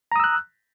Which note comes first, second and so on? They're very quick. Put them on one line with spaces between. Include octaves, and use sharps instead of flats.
A#5 D#6 E6 F#6